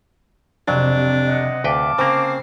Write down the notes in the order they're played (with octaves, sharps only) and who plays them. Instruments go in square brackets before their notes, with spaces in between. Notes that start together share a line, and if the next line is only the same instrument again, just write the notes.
[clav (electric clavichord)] F2 F#3 [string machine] C3 [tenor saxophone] D4
[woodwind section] D#5 F#5
[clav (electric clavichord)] D2 B4 G5 [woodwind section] F5 A5 D6
[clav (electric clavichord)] C#3 A#3 [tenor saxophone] C4 [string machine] C7